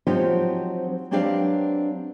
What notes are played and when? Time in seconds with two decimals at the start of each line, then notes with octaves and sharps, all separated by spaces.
0.07 F3 F#3 C4 D#4 F4 G4
1.11 F#3 C4 D4 G4 B4 F5